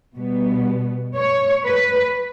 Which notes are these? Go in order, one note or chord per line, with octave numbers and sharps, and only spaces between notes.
B2 G3 B3
C#5
B4